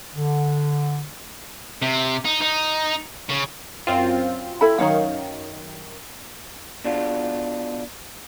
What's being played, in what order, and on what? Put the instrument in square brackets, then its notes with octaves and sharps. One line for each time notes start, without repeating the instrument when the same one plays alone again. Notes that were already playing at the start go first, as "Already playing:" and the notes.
[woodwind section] D3
[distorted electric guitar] C3
D#4
D#4
C#3
[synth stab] F#2 C4 F4
[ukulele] E4 A4 B5
[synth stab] F#2 D#3 [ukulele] D#4 C#5 F5
[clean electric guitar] B2 D4 F4